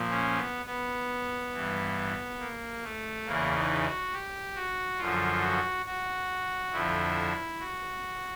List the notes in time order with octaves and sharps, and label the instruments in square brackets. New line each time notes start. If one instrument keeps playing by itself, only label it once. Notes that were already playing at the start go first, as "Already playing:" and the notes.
Already playing: [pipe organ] A#2 F3
C#4
B3
B3
G2 E3
A#3
A3
E2 C#3 E3 A#3
D#4
F#4
G4
F#4
F#2 D3 F3 F4
F#4
F#4
F2 D3 F3 E4
F#4